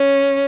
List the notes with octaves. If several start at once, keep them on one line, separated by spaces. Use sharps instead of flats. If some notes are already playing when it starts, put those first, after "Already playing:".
Already playing: C#4